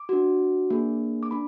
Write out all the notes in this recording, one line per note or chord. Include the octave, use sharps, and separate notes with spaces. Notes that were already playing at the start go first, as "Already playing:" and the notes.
Already playing: D6
D4 F#4
A#3 D4 G#4
D6
D4 B5